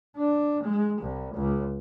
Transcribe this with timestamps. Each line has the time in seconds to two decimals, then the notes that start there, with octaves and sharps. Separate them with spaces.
0.17 D4
0.63 G#3
1.01 C2
1.35 C#2